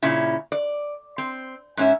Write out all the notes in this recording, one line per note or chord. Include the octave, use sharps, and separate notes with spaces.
A#2 C#3 C#4 E4
D5
C4
G#2 C#4 E5